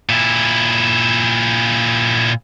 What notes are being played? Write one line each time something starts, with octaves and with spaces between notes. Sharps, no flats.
A#2 E4